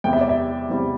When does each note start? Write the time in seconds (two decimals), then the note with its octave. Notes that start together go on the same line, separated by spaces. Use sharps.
0.04 E2 C3 G3 E4 G5
0.13 E5
0.21 D5
0.29 E5
0.69 E2 C3 G3 E4